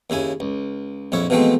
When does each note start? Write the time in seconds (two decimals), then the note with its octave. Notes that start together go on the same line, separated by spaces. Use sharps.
0.10 D#2 C#3 E4 G#5
0.40 C#2
1.12 A#1 F2 E4 C#5
1.30 B2 E3 F3 G#3 A3 C4